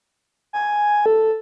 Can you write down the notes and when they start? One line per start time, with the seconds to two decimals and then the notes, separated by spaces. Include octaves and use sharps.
0.53 G#5
1.06 A4